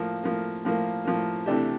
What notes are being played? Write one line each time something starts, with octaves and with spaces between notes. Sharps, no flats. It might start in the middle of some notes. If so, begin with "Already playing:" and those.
Already playing: A2 F3 A#3
A2 F3 A#3
A2 F3 A#3
A2 F3 A#3
C3 E3 A3 D4 G4